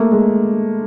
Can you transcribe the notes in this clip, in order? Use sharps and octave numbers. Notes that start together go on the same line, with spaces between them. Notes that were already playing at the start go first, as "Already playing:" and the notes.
Already playing: A3 A#3
G#3